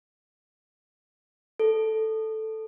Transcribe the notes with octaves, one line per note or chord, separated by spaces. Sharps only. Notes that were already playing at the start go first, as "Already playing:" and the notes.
A4